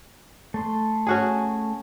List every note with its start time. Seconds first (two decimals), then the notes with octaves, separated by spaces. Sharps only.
0.54 A3 C6
1.07 C#4 F#4 G#4